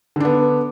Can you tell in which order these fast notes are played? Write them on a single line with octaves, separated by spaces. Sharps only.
D3 D4 B3